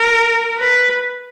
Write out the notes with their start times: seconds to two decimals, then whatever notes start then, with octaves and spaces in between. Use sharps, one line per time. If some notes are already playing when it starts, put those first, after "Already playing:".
Already playing: A#4
0.58 B4